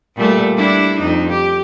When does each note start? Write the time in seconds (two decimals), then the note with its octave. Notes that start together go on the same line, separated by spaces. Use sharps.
0.16 A#2 G3 A3
0.55 G3 D4 E4
0.99 F2 D#4
1.30 G4